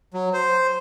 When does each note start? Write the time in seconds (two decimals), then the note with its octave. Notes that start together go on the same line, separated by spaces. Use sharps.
0.14 F#3
0.34 C5